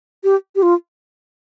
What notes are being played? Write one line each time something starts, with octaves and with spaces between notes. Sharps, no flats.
G4
G4
F4